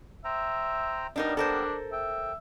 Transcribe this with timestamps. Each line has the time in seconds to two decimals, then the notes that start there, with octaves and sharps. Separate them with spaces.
0.25 C5 E5 G5 A#5
1.16 G3 A#3 B3 D4 D#4 A#4
1.37 D4 A4 A#4 C5
1.92 E5 G5